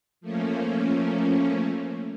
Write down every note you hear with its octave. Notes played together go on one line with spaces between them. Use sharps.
F3 A3 A#3 C#4